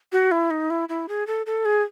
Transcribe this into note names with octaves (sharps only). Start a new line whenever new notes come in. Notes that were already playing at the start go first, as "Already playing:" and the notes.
F#4
E4
D#4
E4
E4
G#4
A4
A4
G#4